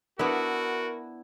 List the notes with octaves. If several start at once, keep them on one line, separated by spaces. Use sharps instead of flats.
B3 D4 E4 F#4 A#4 E5